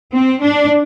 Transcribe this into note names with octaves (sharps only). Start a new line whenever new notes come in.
C4
D4